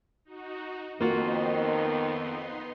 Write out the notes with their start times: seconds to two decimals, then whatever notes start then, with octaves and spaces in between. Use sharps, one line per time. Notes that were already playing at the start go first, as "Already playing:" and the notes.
0.25 D#4 F#4
1.01 F2 D#3 A#3 B3 D#4 F4 F#4 C6